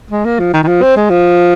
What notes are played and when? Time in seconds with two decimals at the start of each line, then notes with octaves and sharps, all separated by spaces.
0.10 G#3
0.25 A#3
0.39 F3
0.53 D#3
0.63 D#3
0.67 F3
0.82 C4
0.96 G#3
1.10 F3